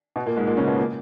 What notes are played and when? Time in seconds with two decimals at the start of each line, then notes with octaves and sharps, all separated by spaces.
0.16 B2 B3
0.26 A#2 A#3
0.36 G#2 G#3
0.46 A#2 A#3
0.57 C#3 C#4
0.67 B2 B3
0.79 A#2 A#3